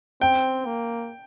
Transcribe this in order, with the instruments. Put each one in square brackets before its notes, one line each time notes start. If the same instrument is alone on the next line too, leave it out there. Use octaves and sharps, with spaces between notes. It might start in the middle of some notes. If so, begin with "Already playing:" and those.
[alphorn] C4 [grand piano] G5
[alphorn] A#3